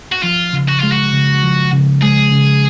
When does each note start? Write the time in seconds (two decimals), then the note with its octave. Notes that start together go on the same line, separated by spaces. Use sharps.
0.12 F#4
0.23 F3 F4
0.53 C#3
0.69 F#4
0.80 G#3 F4
0.92 F#4
1.13 C#3
1.43 F3
1.73 C#3
2.02 G#3 G#4
2.32 C#3